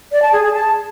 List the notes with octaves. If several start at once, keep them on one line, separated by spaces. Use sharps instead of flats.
D5
A5
G#4
G#4
A5